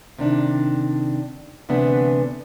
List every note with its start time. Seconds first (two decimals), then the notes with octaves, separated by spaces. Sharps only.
0.18 C3 D#3 D4
1.69 D2 C3 E3 B3 D4